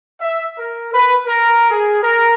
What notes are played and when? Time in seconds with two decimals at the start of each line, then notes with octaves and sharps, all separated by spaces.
0.21 E5
0.58 A#4
0.93 B4
1.26 A#4
1.70 G#4
2.03 A#4